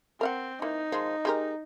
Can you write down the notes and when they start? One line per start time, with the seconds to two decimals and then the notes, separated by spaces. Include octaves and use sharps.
0.21 C4 A#4 F5 F#5
0.62 E3 A#3 D#4
0.92 D#3 F3 G#3
1.25 G#3 G4 A#4